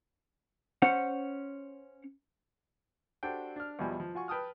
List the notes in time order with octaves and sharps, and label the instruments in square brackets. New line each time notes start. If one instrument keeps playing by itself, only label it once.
[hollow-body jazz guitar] C#4 C5 F#5
[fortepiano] D4 F#4 G4 A4 C5 G5
D4 F6
E2 B2 F3 G3 G#5
F3
F4 F#4 G#5 C#6
B4 G5 A5 D#6 F6